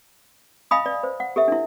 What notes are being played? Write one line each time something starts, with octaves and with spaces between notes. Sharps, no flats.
D#5 F5 G#5 B5 D#6
D5
C5
F#5
G4 A4 E5
D4 E4